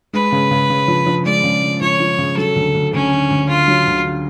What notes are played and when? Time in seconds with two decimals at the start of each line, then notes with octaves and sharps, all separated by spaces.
0.13 G#3 B4
0.32 C#3
0.51 C#3
0.70 C#3
0.88 F3
1.06 F3
1.25 G#3 D5
1.44 C#3
1.63 G#3
1.81 F3 C#5
2.00 F3
2.19 C#3
2.37 F#3 A4
2.56 D2
2.74 D2
2.93 D2 C#4
3.12 D3
3.30 D2
3.48 D3 F4
3.68 F#3
3.87 D2
4.05 D3